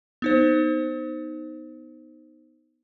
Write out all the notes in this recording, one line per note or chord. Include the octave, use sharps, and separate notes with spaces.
B3 D#4 C5